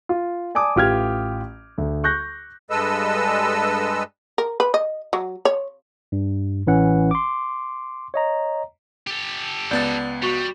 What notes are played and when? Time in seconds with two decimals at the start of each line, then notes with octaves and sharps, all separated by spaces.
0.09 F4
0.55 D5 G#5 A5 D6 D#6
0.76 A1 F4 G4 F6 G#6
1.78 D2
2.04 C#6 F#6 G6 A#6
2.70 G2 G#3 A4 B4 D#5 E6
4.38 A#4
4.60 B4
4.74 D#5
5.13 F#3
5.45 C#5
6.12 G2
6.67 A1 E3 C#4 F#5
7.11 C6 D6
8.14 C#5 D#5 A#5
9.07 G4 A4
9.71 C#2 B3 D5 G6 A6 G7
10.22 G3 F#4 C#6